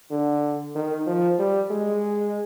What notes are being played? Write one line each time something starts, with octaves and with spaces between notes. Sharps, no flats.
D3
D#3
F3
G3
G#3